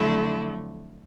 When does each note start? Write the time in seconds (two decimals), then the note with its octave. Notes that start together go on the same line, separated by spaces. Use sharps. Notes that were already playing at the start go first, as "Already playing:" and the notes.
Already playing: F2 D3 F#3 A3 E4